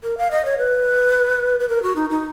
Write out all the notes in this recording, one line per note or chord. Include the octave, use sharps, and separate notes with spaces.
A#4
F5
D#5
C#5
B4
B4
A#4
F#4
D#4
D#4